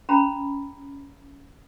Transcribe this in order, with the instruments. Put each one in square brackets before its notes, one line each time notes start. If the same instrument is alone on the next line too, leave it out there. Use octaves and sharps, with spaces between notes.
[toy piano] C#4 A#5 B5